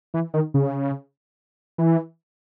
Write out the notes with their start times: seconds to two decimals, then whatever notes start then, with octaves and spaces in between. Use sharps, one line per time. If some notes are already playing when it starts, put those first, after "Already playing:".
0.14 E3
0.34 D#3
0.54 C#3
1.78 E3